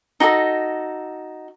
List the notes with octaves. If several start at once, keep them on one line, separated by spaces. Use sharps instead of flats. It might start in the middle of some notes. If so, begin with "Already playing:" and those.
D#4 F#4 G#4 A4